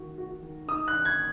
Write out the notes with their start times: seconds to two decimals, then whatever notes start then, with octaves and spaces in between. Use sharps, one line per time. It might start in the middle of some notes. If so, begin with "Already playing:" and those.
Already playing: D#3 F#4
0.18 F#4
0.42 D#3
0.68 D#4 D#6
0.88 F#6
0.93 D#3
1.05 G#6